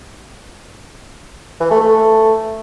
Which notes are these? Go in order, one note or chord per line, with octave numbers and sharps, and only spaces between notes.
E3
A3
A3